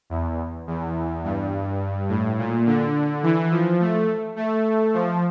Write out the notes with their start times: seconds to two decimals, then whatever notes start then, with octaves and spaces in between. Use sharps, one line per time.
0.10 E2
0.67 E2
1.24 G2
2.09 A2
2.38 A#2
2.66 D3
3.23 E3
3.51 F3
3.80 A3
4.36 A3
4.94 F3